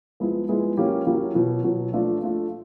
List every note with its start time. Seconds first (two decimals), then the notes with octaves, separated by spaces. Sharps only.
0.20 F3 G#3 B3 E4 G#4
0.49 F3 G#3 B3 E4 G#4
0.77 F#3 A#3 C#4 E4 G4
1.06 F#3 A#3 C#4 E4 G4
1.35 B2 F#3 B3
1.64 B2 F#3 B3
1.93 F3 A3 D4 F4 A4
2.22 F3 A3 D4 F4 A4